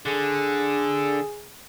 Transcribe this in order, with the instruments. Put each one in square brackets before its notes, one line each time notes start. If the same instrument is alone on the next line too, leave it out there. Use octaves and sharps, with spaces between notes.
[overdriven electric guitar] D3 [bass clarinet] G#4